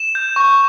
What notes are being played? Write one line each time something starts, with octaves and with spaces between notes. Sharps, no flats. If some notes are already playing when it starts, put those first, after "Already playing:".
Already playing: E7
G6
C#6